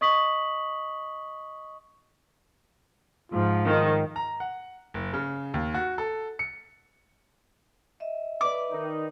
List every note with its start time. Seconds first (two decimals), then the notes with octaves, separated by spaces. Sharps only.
0.01 D#5 C#6 D#6 B6 F#7
3.32 G#2 F3 F4
3.66 D#3
4.16 A#5
4.40 F#5
4.94 F#1
5.13 C#3
5.54 D#2
5.74 F#4
5.98 A4
6.39 C#7
8.00 D#5 E5
8.41 B4 D5 D6
8.71 D#3 D#4